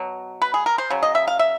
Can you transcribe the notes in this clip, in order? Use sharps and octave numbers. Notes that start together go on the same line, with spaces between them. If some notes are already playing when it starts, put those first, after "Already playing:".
Already playing: B2 F#3
B4
G#4
A#4
C5
C#3 F#3
D#5
E5
F5
E5